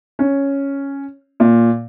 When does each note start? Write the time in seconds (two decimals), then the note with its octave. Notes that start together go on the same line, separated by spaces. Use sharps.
0.19 C#4
1.40 A#2